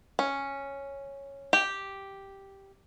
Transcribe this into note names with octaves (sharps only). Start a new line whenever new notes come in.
C#4
G4